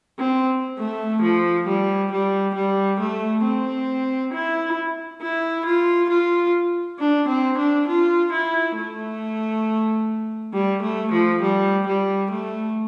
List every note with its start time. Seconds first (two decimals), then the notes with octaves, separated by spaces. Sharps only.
0.19 C4
0.78 A3
1.22 F3
1.68 G3
2.12 G3
2.55 G3
3.00 A3
3.44 C4
4.33 E4
5.22 E4
5.66 F4
6.10 F4
6.99 D4
7.29 C4
7.58 D4
7.88 F4
8.32 E4
8.77 A3
10.53 G3
10.83 A3
11.12 F3
11.42 G3
11.87 G3
12.31 A3